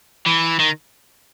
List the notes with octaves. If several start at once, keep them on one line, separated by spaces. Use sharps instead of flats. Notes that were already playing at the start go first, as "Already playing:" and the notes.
E3
D#3